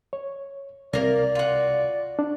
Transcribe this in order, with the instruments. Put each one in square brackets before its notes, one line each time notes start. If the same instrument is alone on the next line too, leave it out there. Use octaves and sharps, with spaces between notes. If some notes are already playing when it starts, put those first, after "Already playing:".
[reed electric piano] C#5
[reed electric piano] C2 C3 [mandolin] A#3 A#4 [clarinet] D5
[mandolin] F4 F#4
[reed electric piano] D4